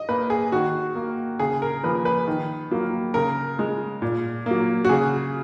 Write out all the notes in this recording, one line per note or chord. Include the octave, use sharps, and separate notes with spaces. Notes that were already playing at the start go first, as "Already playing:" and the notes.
Already playing: D#5
A#3 B4
G#4
D#3 F#4
A#3
C#3 G#4
A#4
F3 A#3 B4
B4
D#3
F#3 A#3
C#3 A#4
G#3
A#2
F#3 A#3
F#4
C#3 G#4